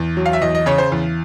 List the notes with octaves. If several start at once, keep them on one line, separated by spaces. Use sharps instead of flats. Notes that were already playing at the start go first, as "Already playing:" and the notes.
Already playing: E2
F#3
F5
E5
E2 D#5
D#5
C#3 C#5
C5
E2